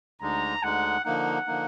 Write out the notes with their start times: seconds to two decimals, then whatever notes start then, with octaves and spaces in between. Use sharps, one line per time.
0.21 D2 D3 G#3 D#4 A#5
0.63 D2 D3 G#3 D#4 F#5
1.05 D3 F3 A#3 D#4 F#5
1.47 D3 F3 A#3 D#4